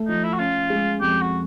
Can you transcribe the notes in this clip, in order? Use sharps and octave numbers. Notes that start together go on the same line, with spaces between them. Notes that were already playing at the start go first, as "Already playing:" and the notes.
Already playing: A3
F3 D#4
E4
F#4
C#4 F4
G#3
F2 G4
F#4